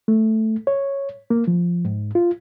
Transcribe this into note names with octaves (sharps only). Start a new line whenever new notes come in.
A3
C#5
A#3
F3
G#2
F4